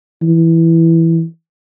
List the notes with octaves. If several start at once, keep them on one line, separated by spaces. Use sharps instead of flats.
E3